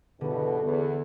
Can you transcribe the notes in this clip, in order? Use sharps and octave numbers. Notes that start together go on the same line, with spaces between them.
E2 G2 B2 D3
E2